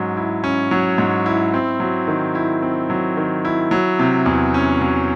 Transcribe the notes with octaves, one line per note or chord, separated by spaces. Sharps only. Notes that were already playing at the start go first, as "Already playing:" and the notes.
Already playing: G#2 F#3 C#4
E4
C#4
F#3
G#2
E4
C4
F#3
D#3
E4
C4
F#3
D#3
E4
F#3
C3
E2
C#4
F#3